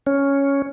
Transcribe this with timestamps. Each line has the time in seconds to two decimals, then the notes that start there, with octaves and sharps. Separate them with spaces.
0.07 C#4